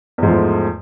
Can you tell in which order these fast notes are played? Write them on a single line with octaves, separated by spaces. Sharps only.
E2 G#2 F3 A3